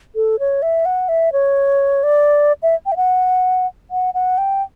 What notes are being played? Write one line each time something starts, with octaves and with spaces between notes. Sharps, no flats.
A4
C#5
E5
F#5
E5
C#5
D5
E5
G5
E5
F#5
F#5
F#5
G5